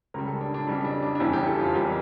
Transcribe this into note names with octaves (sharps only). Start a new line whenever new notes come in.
C#2 C#3 G3 A#4
A4
D4
D4
F2 C#3 G3 D4
D4
D4
D4
F1 E2 E3 G3 E4
G4
A4
F4
F2 E3 G3 A#4